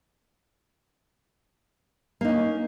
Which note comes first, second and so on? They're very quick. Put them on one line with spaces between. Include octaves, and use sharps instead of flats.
A#3 D#4 C#4